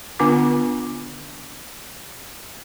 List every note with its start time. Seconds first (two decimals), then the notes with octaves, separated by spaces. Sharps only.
0.19 D3 B3 D4 F4 G#5 D6